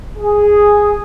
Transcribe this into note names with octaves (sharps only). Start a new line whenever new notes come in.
G#4